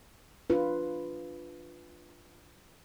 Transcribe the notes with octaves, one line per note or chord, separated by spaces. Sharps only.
D4 F4 B4